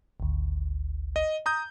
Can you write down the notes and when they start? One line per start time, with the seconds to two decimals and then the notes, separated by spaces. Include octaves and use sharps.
0.20 G#1 D2
1.16 D#5
1.46 A#5 D#6 G6